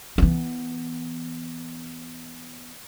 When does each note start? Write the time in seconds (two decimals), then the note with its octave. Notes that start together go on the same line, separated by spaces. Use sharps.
0.18 E3 B3